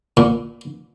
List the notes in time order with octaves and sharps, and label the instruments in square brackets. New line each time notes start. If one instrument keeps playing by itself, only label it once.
[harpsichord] A#2